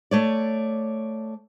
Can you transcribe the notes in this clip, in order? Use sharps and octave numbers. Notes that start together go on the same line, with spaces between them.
A3 C#5 D5